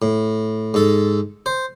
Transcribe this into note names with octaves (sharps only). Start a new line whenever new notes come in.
A2
G#2 A4
C5